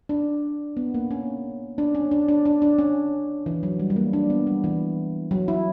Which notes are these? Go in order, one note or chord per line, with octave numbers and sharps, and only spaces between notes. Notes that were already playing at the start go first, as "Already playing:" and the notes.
D4
B3
A#3
C#4
D4
C#4
D4
D4
D4
D4
C#4
E3
F#3
G3
G3
A#3
D4
B3
G3
E3
F#3
E4